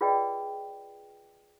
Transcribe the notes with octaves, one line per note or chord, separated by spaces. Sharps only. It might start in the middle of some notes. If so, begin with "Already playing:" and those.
F4 G#4 B4 D5 D#5 G5